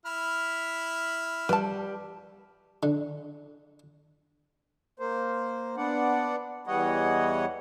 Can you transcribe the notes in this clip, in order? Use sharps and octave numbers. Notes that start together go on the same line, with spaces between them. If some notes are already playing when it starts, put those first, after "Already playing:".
E4 B5 F6
G3 B4 A5
D3
A#3 C5
B3 D4 D5 F#5
E2 E3 G3 C#5 D#5 F#5